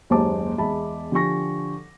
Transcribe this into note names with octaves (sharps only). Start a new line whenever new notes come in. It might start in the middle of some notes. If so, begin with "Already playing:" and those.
F#1 D#2 G#3 C5 A5 D6
E2 G#3 E5 A5 B5
D3 F3 G4 G#5 C#6 A#6